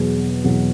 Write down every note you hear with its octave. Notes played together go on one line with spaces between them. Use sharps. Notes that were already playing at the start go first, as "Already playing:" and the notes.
Already playing: E2 B2 F#3 G#4
E2 B2 F#3